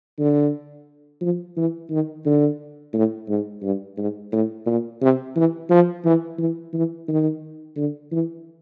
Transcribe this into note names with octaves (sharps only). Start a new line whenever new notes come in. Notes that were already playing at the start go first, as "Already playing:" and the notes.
D3
F3
E3
D#3
D3
A2
G#2
G2
G#2
A2
A#2
C3
E3
F3
E3
E3
E3
D#3
D3
E3